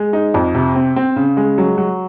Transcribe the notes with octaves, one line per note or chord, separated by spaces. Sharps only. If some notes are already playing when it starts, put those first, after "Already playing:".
Already playing: G#3
D#4
F2
C3
C4
C4
C#3
G#3
F#3
F#3